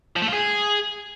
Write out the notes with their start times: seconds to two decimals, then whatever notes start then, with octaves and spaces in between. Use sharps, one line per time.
0.16 F3
0.22 A3
0.27 F4
0.33 G#4